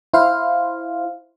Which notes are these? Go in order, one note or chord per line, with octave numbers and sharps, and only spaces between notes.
E4 C5 F5